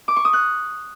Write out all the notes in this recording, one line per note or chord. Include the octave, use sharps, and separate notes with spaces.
D6
C#6
D#6
F#6